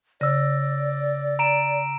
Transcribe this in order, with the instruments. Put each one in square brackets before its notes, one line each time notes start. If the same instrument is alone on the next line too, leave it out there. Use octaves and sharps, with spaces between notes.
[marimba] C#3 [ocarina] D5 [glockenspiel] E6 A#6
[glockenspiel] A#5 D7 E7